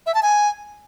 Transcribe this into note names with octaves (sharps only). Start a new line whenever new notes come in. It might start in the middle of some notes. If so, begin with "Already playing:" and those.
E5
A5
G#5